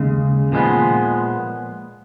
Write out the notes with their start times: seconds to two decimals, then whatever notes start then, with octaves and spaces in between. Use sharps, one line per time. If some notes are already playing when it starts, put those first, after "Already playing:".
Already playing: D#2 C#3 G#3
0.52 A#2 F3 G#3 B3